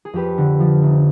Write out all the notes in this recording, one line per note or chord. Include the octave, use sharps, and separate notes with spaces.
G#4
F2 G4 B4
D3
F3
F1